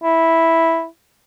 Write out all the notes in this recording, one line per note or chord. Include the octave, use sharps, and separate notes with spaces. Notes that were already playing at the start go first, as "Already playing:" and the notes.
E4